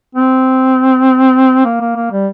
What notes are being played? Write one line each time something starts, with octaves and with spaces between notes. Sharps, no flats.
C4
A#3
A#3
A#3
G3